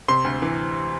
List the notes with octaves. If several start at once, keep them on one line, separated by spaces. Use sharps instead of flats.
C3 C6
D2
E3